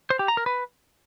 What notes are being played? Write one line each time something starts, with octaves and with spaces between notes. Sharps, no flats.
C5
G4
A#5
A#4
B4